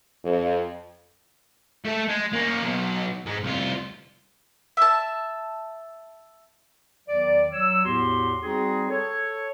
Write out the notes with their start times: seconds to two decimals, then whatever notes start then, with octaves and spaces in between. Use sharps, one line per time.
0.25 F2
1.85 A3 A4
2.08 G#3
2.33 A#3 C#4
2.63 B1 B2
3.26 G#2 G#3
3.43 C2 F4
4.77 E5 A5
7.08 E2 D#3 F#3 D5
7.53 F#3 C#5 E6
7.85 E2 A2 B3 F#4 G4 C6
8.41 G3 C4 D#4 F#4 G#4
8.90 A4 C#5